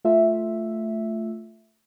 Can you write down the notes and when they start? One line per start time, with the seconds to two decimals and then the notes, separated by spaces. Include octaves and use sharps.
0.04 A3 F4 E5